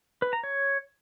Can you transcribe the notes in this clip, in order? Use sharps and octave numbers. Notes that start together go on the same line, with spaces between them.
B4
A#5
C#5